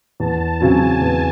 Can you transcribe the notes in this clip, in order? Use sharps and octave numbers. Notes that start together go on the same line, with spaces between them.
E2 A5
C#3 F#3 C4 G#5
E2